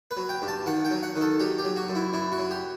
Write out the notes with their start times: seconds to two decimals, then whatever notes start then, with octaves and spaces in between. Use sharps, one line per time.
0.11 B4
0.17 F#3
0.29 G5
0.42 G2
0.48 A5
0.66 D#3 F#5
0.85 G5
0.91 F#3
1.03 F#5
1.16 D#3
1.21 A4
1.40 F#3 G4
1.58 G4
1.65 F#3
1.76 F#4
1.88 F#2
1.95 E4
2.13 F#2 E4
2.32 F#4
2.39 F#3
2.51 G4